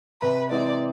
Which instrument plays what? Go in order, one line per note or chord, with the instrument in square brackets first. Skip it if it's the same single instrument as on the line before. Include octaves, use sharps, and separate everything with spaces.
[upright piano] C3 [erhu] B4
[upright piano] E3 G#3 C4 [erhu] D5